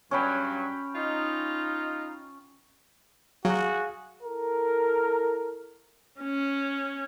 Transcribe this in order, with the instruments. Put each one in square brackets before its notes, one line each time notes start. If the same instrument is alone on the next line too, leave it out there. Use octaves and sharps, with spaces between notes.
[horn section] G2 F#3 [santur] C#4 G5 B5
[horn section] D#4 F4
[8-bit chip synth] F#3 [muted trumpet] F#4 [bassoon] G#4 [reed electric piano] F5
[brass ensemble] E4 A4 A#4
[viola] C#4